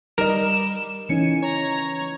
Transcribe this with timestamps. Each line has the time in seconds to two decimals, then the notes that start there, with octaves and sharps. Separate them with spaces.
0.18 G3 D#4 A#4 D#5 E7
1.09 E3 C#4 D#4 G#5 C#7
1.43 C#5 A#5